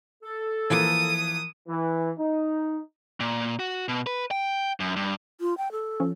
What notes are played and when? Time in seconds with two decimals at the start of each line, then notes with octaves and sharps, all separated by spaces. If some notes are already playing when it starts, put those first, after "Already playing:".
0.23 A4
0.70 E3 F3 A#3 D#6
1.68 E3
2.18 D#4
3.20 A#2
3.60 F#4
3.88 B2
4.07 B4
4.31 G5
4.80 F#2
4.96 G2
5.41 F4
5.58 G5
5.72 A4
6.00 F3 C#4